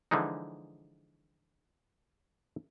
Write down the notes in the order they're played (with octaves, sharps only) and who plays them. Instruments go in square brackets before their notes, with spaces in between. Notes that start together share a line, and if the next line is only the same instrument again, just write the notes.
[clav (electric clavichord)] D3 E3 F3 G#3 D#4